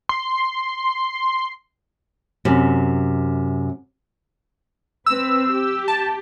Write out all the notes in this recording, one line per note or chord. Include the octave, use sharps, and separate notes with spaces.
C6
F#2 C3
C4 B4 E6
G4
A5